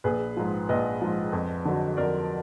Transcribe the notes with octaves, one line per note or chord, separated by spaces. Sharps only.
A#1 G#4 B4
G#2 F3
A#1 B4 D#5
G#2 F3
F2
D3 F#3
F2 A#4 D5